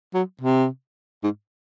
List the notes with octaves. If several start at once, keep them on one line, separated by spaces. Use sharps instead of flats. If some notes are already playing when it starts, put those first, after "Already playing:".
F#3
C3
G#2